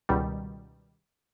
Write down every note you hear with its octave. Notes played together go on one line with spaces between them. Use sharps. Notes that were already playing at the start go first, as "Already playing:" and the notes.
C#2 B2 D#3 G3